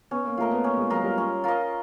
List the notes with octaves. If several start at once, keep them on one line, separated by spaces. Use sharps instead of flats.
B3 C#4
A#3
A3 F4 A#4 D#5
B3
A#3 C#4
G#3
F#3 F4 A#4 D#5
G3
C#4
F4 A#4 D#5